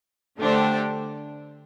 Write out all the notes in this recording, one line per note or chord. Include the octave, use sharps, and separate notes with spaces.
D3 A3 D4 G4 C5